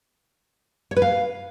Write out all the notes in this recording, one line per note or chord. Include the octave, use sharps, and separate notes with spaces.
C#5
B4
F5